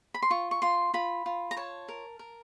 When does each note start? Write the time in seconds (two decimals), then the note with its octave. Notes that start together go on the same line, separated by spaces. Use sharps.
0.14 B5
0.22 C6
0.30 F4 C#6
0.51 C#6
0.62 F4 C6
0.94 F4 B5
1.26 F4
1.51 A#5
1.57 C#5 A5
1.89 A#4
2.19 A#4